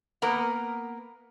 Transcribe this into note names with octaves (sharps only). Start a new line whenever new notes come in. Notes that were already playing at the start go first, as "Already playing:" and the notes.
A#3 B3 A#4 B4 F#5